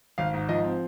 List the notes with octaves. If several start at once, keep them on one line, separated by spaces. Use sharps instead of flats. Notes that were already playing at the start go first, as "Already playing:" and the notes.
G#1 F5
G#2
F3 D#5
C4